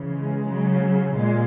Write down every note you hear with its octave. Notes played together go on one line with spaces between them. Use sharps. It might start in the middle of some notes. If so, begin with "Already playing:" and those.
Already playing: C#3 E3
G#3
C#3 F#3
A#2 G#3